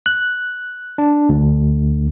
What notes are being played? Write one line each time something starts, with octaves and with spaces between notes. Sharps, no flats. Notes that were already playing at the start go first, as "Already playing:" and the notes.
F#6
D4
D2